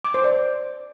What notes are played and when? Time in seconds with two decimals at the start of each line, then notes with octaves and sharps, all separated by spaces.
0.04 D6
0.14 C5
0.24 D5